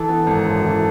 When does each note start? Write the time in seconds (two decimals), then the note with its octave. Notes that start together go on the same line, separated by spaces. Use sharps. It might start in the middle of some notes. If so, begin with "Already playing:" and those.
Already playing: E3 A4
0.09 B3
0.27 G#1
0.45 F#2 A4
0.65 E3